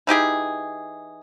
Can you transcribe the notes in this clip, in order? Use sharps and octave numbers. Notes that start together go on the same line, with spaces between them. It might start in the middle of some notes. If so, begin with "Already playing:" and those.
E3 D#4 G4 G#4